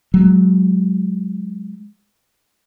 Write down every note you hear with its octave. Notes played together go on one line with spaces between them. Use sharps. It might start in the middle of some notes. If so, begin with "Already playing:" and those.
F#3 G#3